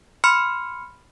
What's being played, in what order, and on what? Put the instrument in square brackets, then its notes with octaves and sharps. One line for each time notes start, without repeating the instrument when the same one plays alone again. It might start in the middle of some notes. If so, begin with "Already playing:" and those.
[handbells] B5 C6 F6 C#7